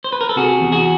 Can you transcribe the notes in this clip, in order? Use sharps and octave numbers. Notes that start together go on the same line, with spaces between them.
C5
B4
A#4
A4
C3 F#4 G#4
E2
F#4 G#4